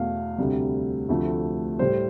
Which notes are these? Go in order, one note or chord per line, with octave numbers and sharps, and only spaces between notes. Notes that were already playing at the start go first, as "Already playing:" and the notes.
Already playing: E2 B2 A3 F5
D2 C3 G3
D2 C3 F3 A3
A2 G3 C5